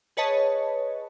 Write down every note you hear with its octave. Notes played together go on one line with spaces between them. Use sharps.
G#4 B4 C#5 D#5 A5